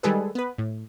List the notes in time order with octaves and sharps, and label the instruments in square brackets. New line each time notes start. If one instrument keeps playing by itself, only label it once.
[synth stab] D#3 G3 G#3 G#4 A4 B4
B3 B4
A2